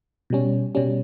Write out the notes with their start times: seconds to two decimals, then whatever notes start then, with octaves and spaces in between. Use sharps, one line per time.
0.30 B2 G3 C#4
0.75 B2 G3 C#4